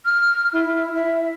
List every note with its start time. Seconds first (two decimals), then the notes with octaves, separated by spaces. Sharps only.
0.05 F6
0.52 E4
0.94 E5